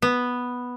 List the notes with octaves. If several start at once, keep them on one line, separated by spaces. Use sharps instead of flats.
B3